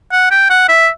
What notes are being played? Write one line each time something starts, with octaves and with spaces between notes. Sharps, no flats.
F#5
G5
F#5
E5